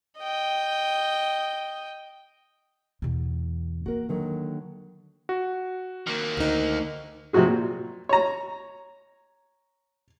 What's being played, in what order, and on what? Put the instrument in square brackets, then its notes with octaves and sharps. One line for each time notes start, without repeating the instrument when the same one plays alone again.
[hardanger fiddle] D#5 G5
[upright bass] E2 B2
[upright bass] A#3 [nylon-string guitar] F#4 A#4
[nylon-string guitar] D3 D#3 F#3
[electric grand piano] F#4
[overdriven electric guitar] D#3 A#3
[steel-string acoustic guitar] D2 D#4
[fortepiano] C3 F3 F#3 F#4 G#4
A#2
C#5 A#5